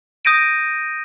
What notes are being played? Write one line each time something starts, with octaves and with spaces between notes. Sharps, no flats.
D#6 G6 A#6 D7 D#7